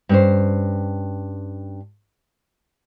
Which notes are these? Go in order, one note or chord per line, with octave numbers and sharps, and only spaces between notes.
G2 C#4 C5